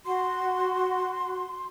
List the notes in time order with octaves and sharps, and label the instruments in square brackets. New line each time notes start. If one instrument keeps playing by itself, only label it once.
[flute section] F#4 [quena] C6